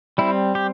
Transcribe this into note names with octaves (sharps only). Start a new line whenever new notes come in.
G3 C4 E4
G4